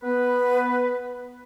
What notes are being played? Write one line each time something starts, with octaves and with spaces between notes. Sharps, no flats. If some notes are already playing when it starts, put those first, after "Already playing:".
B3 B4